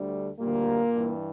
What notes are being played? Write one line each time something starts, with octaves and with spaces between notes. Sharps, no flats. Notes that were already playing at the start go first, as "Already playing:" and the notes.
Already playing: D2 D3 G3
D2 A#2 D3 G3 A#3
G2 E3 G3